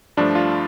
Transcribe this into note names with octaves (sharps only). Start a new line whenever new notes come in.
G2 F3 A3 D4
F4